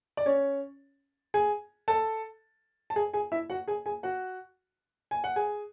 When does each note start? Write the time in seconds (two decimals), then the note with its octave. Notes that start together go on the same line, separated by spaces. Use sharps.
0.17 D5
0.26 C#4 C#5
1.34 G#4 G#5
1.88 A4 A5
2.90 A5
2.96 G#4 G#5
3.14 G#4 G#5
3.32 E4 E5
3.50 F#4 F#5
3.68 G#4 G#5
3.86 G#4 G#5
4.03 F#4 F#5
5.11 G#5
5.24 F#5
5.36 G#4 G#5